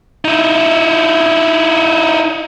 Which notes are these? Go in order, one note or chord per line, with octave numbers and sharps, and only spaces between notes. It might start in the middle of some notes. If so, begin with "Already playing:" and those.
D#4 E4